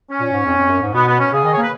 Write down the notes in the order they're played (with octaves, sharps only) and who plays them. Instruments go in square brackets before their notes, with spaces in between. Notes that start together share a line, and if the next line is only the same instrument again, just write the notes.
[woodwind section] C#4
[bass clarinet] A#2
G#2
F2
F2
F#2
G#2
[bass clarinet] B2 [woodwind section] B3
[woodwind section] B3
C#4
[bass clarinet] C#3 [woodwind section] G#4
[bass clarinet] D#3 [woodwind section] D#5
[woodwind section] C#5
[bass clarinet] A#3
[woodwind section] B4